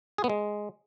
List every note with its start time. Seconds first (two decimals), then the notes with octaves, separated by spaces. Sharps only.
0.18 G#4
0.24 B3
0.29 G#3